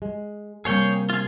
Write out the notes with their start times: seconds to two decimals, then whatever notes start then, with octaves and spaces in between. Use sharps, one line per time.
0.02 G#3
0.65 C3 G3 A#3 G#4 C#5 G5
1.10 F4 G#4